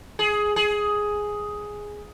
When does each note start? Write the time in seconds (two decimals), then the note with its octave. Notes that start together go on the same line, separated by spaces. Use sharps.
0.19 G#4
0.56 G#4